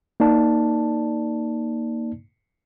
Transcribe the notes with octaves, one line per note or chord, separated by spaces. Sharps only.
A#3 D#4 D5 A5